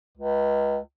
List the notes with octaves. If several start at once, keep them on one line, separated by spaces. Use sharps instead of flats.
C#2